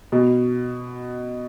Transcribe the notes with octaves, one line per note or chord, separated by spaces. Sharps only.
B2